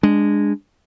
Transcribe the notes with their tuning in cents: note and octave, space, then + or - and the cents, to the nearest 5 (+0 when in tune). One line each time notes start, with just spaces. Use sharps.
G#3 -10 D4 +0